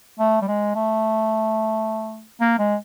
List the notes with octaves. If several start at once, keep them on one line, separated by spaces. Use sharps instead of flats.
A3
G3
G#3
A3
A#3
G#3